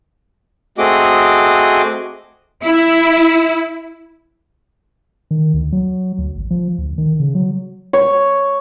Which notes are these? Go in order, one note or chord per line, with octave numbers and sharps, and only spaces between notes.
A3 C4 F#4 G#4 D#5 D6
E4
D#3
D2
F#3
D2
G#1
F3
D2
D#3
C#3
F#3
C#5